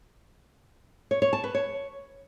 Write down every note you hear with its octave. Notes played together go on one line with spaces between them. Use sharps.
C#5
C#5
A5
B4
C#5